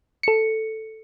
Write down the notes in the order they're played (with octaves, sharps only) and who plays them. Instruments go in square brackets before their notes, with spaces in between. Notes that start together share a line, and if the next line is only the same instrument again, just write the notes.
[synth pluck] A4 C#7